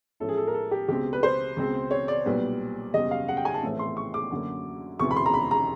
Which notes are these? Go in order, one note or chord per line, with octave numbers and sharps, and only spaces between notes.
A1 A2 F3 G#3 A4
G#4
A4
A#4
A4
G4
C#2 B2 G#3 C4 G4
B4
C5
C#2 B2 G#3 C4
C#5
D5
B1 A#2 G3 B3
F#1 E2 B2 G3 D#5
F5
F#5
G5
G#5
A5
A#1 A2 E3 A3 C4
C6
C#6
D6
F#2 D3 F#3 A#3
E1 D2 C3 E3 C#6
B5
C6
A#5
B5
A#5